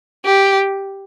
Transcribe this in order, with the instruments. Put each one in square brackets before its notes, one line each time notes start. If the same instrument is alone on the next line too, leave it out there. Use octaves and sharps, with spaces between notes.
[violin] G4